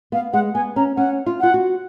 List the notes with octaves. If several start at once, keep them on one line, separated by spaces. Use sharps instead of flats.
B3 F5
G#3 F#5
B3 G#5
C#4 A#5
C#4 F#5
F4
F4 F#5
F#4